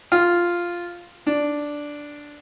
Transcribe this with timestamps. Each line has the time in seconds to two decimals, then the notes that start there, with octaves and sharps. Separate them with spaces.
0.12 F4
1.26 D4